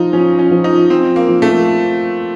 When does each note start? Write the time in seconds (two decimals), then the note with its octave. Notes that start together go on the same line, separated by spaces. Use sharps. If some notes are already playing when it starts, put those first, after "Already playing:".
Already playing: F3 D#4 F4
0.13 F3 C#4
0.39 C#4
0.51 F3
0.64 D#4
0.90 F3 C4
1.16 A#3
1.28 F3
1.42 A3